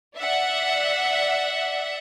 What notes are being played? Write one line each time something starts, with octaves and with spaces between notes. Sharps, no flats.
D5 E5 F#5